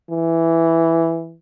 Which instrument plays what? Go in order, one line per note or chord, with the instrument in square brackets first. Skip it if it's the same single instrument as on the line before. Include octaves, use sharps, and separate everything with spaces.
[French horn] E3